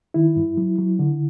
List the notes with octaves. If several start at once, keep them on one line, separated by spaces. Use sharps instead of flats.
D#3 E4
G2
F#3
F#3
D3